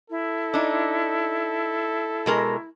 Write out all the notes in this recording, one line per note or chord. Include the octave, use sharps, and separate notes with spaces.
E4 A4
D4 D#4
B2 G#3 A#4